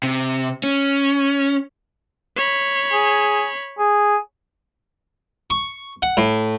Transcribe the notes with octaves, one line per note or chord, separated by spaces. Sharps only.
C3
C#4
C#5 B5
G#4
G#4
C#6
F#5
A2